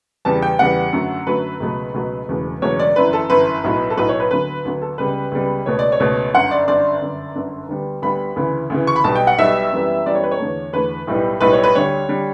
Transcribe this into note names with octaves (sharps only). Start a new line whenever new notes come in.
E2 C#3 G3 B3 A5
G5
E2 C#3 G3 B3 F#5
F#2 D3 F#3 A3
F#2 D3 F#3 A3 B4
C#2 B2 F#3 A3
C#2 B2 F#3 A3
E1 E2 C#3 F#3 A3
E1 E2 C#3 F#3 A3 C#5
D5
G1 F#2 E3 B4
A4
G1 F#2 E3 B4
B1 A2 F#3 B3
A4
B1 A2 F#3 B3 B4
C#5
B4
D2 D3 F#3 B3 B4
D2 D3 F#3 B3
A4
C#2 C#3 G3 B3 B4
C#2 C#3 G3 B3
C#2 B2 A3 C#5
D5
C#5
C#2 B2 A3
G1 F#2 D3 F#5
D5
G1 F#2 D3 D5
G1 F#2 D3
G1 F#2 D3
D2 D3 G3 B3
D2 D3 G3 B3 B5
D2 C#3 E3
D2 C#3 E3
C#6
B5
B1 B2 G3 A5
G5
F#5
B1 B2 G3 E5
F#2 E3 G3 B3
F#2 E3 G3 B3 D5
C#5
B4
C#5
E2 D3 A3
E2 D3 A3 B4
B1 A2 G3 B3
B1 A2 G3 B3 B4
C#5
B4
D2 D3 G3 C#5
D3 G3